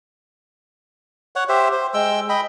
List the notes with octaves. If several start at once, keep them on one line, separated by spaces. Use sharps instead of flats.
C#5 F#5
G4 C5 E5
C5
G#3 G5 E6
D#5 G5 B5